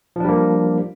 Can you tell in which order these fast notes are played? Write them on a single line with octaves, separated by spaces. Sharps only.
F3 D4 G3 A#3